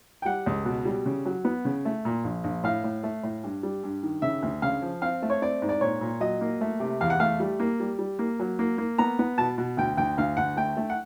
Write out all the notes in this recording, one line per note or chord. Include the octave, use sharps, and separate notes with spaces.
G5
G3 F#5
C#2
B2
G3
C#3
F#3
B3
C#3
A3
A#2
A#1
A#1
A2 F5
A2
A3
A2
G2
G3
G2
D#3
C#3 E5
D2
C#3 F5
F3
C4 F5
A3
C#5
C4 D5
G#2
D5
A#2 C#5
A#2
F#3 D#5
A#3
A3
C3
E2 F5
F#5
A3 F5
G3
A#3
G3
G3
A#3
F#3
A#3
A#3
B3 A#5
B3
B2 A5
B2
D2 G5
D2 G5
D2 F5
D2 F#5
A3 G5
A3
F#5